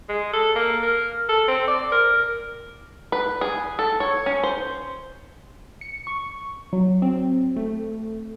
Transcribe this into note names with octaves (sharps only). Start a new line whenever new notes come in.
G#3
A4
A#3
A#4
A4
C4
D5
A#4
B4
G#4
A4
C#5
C#4
C5
C#7
C#6
F#3
C4
A3